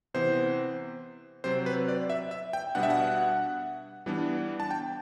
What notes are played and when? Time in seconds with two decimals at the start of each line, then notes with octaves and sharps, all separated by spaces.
0.14 C3 E3 B3 C5
1.44 C3 F#3 C4 C5
1.66 B4
1.88 D5
2.10 E5
2.31 E5
2.53 G5
2.75 B2 G3 B3 D4 F#5
2.83 E5
2.90 F#5
4.06 E3 G3 B3 D4
4.60 A5
4.71 G5